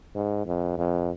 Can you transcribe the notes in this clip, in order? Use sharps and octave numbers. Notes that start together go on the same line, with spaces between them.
G#2
F2
F2